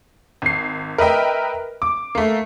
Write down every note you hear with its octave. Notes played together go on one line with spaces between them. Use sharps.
G#1 C7
A#4 B4 D#5 E5 G5
D6
A3 A#3